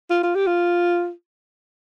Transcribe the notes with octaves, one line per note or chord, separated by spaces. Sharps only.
F4
F4
G4
F4